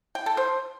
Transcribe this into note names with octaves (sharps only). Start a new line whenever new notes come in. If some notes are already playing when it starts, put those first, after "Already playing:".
G5
A4
C5